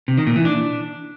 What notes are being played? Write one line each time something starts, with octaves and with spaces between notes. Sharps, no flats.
C3
D#3
A#2
E3
D4